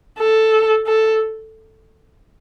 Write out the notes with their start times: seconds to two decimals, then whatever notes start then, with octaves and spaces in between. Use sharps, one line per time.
0.18 A4
0.87 A4